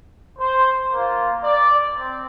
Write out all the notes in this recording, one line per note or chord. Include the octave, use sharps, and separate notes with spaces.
C5
A#3 F4
D5
C4